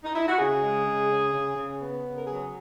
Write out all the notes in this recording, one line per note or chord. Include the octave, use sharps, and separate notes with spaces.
D#4
E4
F#4
C#3 G#4
G#3
C#3
C#3
C#3
C#3
B3
C#3
A#4
F#3 G#4